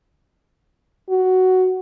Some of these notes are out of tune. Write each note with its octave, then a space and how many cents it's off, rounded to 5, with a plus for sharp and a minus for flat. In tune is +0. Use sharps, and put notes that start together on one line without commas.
F#4 +5